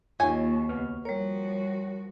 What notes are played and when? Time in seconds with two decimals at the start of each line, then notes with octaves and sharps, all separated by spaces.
0.20 D#2 F#3 A#3 D#4 F4 G#5 C#6
0.69 C#2 B3 F6
1.05 F3 G3 F#4 A#4 C#5